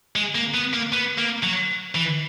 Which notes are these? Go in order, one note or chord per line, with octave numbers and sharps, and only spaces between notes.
G#3
A#3
B3
A#3
B3
A#3
F#3
E3